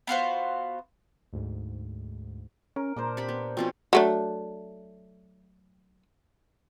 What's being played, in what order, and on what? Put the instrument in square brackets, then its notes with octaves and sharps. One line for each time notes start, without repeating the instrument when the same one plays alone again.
[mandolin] B3 F4 F#4 C5
[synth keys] D2 G#2
[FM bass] C#4 [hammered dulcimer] A#4
[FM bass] A#2 [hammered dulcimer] D4 A#4 C5
[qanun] C4 G4 B5
B3
[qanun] B2 F3 C#4 [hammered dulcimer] C4
[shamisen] F#3 A3 D4